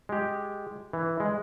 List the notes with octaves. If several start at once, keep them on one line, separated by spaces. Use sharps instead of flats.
G#3 G4
E3
G#3